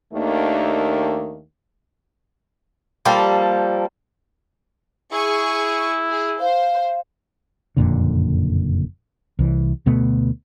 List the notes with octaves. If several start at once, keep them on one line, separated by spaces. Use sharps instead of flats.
D#2 D#3 A3 A#3 D4
F3 G3 A#3 A4
E4 G#4 C#6
G#4
C5 F5
F#1 F2 A#2 D3
C2 E3
D2 B2 A3 B3